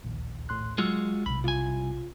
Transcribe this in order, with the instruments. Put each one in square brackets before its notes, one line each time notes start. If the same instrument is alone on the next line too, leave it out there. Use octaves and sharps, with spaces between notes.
[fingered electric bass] D1 A#1 D#2
[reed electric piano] A2 C6 F#6
[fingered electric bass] F#3 [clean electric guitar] G#3 F4 F#4 [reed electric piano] E6 F6
[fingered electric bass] B1 C3 [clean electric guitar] B5
[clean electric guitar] C2 G#5 [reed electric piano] F4